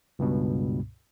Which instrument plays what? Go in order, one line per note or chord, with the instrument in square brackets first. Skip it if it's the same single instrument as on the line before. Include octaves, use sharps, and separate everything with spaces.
[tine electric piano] C#2 G2 B2